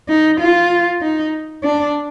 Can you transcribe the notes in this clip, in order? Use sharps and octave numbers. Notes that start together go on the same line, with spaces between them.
D#4
F4
D#4
D4